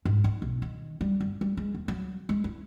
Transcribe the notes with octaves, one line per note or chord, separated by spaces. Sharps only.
G#2
D#4
B1
D#3
G3
G1
G3
G#3
D#2
F#3
G#3
E4